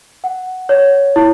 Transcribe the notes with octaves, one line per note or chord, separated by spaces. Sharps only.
F#5
C#5
E4